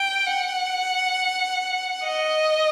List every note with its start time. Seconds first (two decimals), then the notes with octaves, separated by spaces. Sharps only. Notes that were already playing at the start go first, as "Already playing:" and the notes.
Already playing: G5
0.26 F#5
2.04 D#5